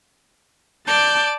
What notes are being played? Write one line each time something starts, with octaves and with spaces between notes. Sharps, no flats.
D5 A5 D6 G6